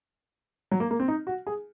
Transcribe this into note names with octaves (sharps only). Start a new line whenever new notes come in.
F#3
A#3
A#3
C4
D#4
F#4
G#4